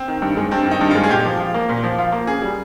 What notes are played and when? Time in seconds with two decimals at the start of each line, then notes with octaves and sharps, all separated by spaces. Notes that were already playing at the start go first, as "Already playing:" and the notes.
Already playing: C4
0.08 D#3
0.22 G2
0.37 G#3
0.51 G2 C4
0.66 D#3
0.71 D#4
0.81 G2
0.91 F4
0.95 G#3
1.04 G#4
1.10 A#2 G4
1.25 F3
1.39 F4
1.54 A#3
1.69 A#2
1.83 F3
1.98 F4
2.12 A#3
2.27 C#3 G#4
2.42 G3